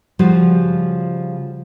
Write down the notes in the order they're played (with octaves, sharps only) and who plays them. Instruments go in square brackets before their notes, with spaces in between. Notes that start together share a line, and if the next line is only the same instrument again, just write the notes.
[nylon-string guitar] C#3 F3 G3 F4 F#4 D5